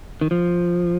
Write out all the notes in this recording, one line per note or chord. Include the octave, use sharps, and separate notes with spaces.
D#3
F3